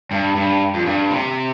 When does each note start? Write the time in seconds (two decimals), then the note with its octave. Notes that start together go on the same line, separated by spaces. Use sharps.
0.11 G2
0.36 G2
0.74 F2
0.86 G2
1.10 C3